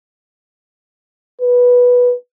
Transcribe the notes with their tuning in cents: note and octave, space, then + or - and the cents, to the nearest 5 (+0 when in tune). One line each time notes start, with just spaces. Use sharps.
B4 -10